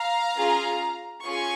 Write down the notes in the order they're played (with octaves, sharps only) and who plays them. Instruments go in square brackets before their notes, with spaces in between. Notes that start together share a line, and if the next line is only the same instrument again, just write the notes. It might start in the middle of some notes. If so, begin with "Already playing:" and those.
Already playing: [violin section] F5 A#5
C#4 F4 G#4
C#4 F4 G#4 G#5 C#6